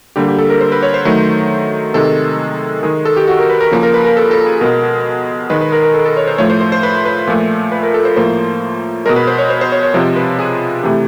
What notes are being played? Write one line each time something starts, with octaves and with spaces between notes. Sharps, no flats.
D3 G3 A#3 G4
G4
A4
A#4
C5
B4
C#5
C5
D#3 F#3 A3
C3 D#3 G#3 A4
D#3 G#3 G#4
A4
G4
F#4
A#4
B4
A#4
C#3 F3 A#3
A#4
B4
A#4
A4
A4
G#4
B2 G#3 A#4
D#3 G#3 B4
B4
A#4
A#4
A4
A4
C#5
C5
A2 F3 A3 C#5
C5
C5
C5
B4
B4
A#2 F3 A3
B4
A#4
A4
C5
A2 F3 A#3 C5
B2 G#3 A#4
B4
C5
C#5
C5
C5
C#5
C#5
C3 F3 G#3 C5
B4
G#4
C3 E3 A3 G4